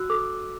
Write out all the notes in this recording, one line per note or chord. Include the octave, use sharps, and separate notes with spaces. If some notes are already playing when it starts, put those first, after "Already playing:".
Already playing: F#4 E6 F#6
A4 D6